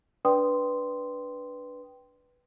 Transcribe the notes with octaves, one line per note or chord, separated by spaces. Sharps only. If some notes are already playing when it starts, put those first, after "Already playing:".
D4 B4 D5 G5 C6 D#6